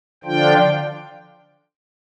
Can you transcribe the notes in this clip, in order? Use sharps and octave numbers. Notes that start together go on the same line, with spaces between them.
D3 F3 D4 F4 G5